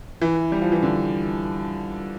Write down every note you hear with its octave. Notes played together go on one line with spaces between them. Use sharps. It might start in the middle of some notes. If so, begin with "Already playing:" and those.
E3
G3
F3
E3
D3